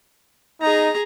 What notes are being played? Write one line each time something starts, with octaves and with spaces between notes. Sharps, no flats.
D#4 G#4 A#5